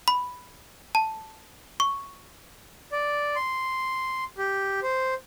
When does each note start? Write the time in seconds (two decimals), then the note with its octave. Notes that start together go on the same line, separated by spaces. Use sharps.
0.08 B5
0.95 A5
1.80 C#6
2.92 D5
3.36 C6
4.38 G4
4.83 C5